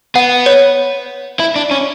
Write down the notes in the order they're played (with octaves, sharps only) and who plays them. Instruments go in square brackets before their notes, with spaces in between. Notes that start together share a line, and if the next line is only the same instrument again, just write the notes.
[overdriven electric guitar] B3 [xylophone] F#5
[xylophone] C#5
[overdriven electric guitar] E4
D4
C#4